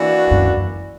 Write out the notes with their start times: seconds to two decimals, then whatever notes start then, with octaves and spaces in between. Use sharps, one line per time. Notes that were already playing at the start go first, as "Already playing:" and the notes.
Already playing: E3 A#3 D4 F#4
0.31 F#2